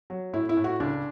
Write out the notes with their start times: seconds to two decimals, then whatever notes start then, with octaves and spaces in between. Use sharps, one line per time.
0.10 F#3
0.33 A2 E4
0.49 E4
0.57 A2
0.64 F#4
0.80 C#2 D4